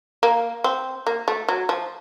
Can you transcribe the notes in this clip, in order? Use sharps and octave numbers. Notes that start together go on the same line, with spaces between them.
A#3
C4
A#3
A3
F#3
F3